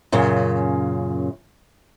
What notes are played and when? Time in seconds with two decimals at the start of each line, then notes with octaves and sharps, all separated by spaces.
0.12 F#2 A#2 C#3